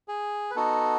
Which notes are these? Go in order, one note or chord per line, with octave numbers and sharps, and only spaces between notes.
G#4
B4
B3 D#4 F#4 A4